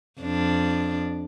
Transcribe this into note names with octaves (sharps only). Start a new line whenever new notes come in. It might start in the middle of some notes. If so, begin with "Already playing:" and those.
F2 D4